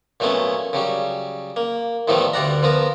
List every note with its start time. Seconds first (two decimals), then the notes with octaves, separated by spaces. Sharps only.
0.20 A#2 F#3 A3 B3 C#4
0.73 C#3 F#3 G3
1.56 A#3
2.08 A2 D#3 F3 G3 A3 B3
2.33 D2 G3 D5 F#5 A#5
2.63 F3 B3 A#4